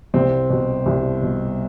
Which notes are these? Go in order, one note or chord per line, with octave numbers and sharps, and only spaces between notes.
C2 C4
B2
C2
B2